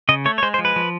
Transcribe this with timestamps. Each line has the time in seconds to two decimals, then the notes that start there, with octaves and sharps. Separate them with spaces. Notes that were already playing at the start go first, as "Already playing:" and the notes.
0.09 C#3 D#5
0.25 A3 C#5
0.38 C#5
0.42 G#3 C5
0.54 C5
0.59 F3
0.65 B4
0.76 F3